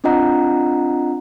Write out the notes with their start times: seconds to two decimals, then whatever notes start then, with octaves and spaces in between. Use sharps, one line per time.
0.04 C4 D4 F4 D#5 F#5 A#5